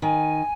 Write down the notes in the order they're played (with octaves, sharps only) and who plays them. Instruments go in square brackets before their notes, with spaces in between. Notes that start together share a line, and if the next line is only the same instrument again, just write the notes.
[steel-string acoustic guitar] D#3 [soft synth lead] G#5